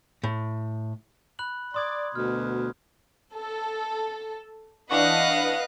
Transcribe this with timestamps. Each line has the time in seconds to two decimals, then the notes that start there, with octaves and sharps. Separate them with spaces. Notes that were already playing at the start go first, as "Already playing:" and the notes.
0.24 A2
1.39 B5 F#6 F#7
1.74 D5 C6 D#6 G#6
2.15 D2 B2 F6
3.35 A4
4.91 E3 D4 B4 D#5 F5 F#5 C#6 F#6